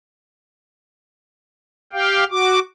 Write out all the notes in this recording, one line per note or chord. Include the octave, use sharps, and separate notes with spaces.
G4 F5 G5
F#4 D6